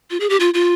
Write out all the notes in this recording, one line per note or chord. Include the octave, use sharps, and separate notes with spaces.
F4
G#4
G4
F4
F4